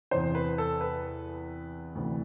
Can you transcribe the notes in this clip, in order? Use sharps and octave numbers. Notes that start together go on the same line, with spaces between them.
E2 C3 E3 C5
B4
A4
B4
D2 C3 E3